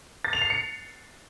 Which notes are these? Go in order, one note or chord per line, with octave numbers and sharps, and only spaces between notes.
A6
F7
C7
C#7